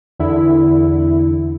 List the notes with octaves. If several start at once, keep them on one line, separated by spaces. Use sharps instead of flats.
E2 D3 E4